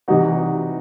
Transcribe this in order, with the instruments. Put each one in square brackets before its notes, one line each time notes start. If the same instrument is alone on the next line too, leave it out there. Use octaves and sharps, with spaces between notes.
[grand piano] C3 E3 G3 D#4 F#4